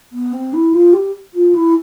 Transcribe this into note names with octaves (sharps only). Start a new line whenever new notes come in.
B3
C4
E4
F4
G4
F4
E4